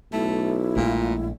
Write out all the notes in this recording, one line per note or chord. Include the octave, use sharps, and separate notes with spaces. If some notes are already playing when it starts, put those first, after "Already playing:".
B1 A3 E4
A#1 A#2 G#3 A3